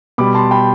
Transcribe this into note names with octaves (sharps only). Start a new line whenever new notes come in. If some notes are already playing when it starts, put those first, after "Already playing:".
B2 G3 B5 D6
A5 C6
G5 B5